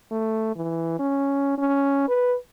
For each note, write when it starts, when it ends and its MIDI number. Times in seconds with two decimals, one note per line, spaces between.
0.12 0.54 57
0.56 0.98 52
0.99 1.54 61
1.58 2.04 61
2.08 2.35 71